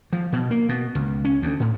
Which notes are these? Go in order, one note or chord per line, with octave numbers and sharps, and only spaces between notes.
F3
B2
A#3
B2
C#2
C#4
D2
A2